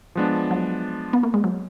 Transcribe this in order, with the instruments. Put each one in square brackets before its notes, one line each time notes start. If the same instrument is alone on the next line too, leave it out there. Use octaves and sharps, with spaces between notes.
[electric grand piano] F3 G#3 B3 D4
[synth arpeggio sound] F#3
B3
A#3
G#3
F#3